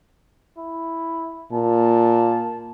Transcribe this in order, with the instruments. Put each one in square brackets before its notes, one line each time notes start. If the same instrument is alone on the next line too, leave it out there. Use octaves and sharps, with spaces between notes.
[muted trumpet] E4
[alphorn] A#2 [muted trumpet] A5